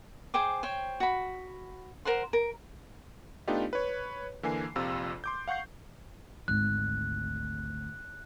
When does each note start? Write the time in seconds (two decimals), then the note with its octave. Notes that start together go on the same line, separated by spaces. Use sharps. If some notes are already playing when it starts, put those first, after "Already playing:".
0.34 G#4 C5 G5 D6
0.63 C5 C#5 G5
1.00 F#4 B5
2.05 A#4 C5 F#5 C6
2.33 A#4
3.48 A3 B3 D4 D#4 F4 G4
3.73 B4 C#5
4.43 D3 E3 A#3 G#5 C7
4.75 A#1 F2 C3 F4 E6
5.24 C6 D6 G6
5.48 F5 F#5 C#6 G6 C7
6.48 G#1 D2 F#6